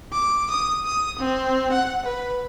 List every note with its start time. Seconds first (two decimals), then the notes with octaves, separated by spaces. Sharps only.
0.12 D6
0.50 D#6
0.85 D#6
1.19 C4
1.72 F#5
2.05 B4